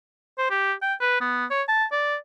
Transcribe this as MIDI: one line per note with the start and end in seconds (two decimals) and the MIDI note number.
0.38 0.49 72
0.50 0.73 67
0.82 0.94 79
1.00 1.20 71
1.21 1.46 59
1.51 1.62 73
1.68 1.85 81
1.92 2.16 74